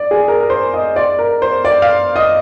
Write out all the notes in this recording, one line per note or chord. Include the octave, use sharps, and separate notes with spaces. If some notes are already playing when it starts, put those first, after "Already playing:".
Already playing: D5
G#4
A#4
A#4
C5
D#5
D5
A#4
C5
D5
F5
D#5